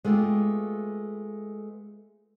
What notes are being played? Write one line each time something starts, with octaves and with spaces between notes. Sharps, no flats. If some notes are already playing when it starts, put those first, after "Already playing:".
G#3 A3 B3 F4 G4